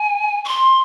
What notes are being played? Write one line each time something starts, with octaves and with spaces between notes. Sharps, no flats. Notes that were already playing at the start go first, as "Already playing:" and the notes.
Already playing: G#5
C#6
C6